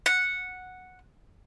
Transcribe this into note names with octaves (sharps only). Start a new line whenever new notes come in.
F#5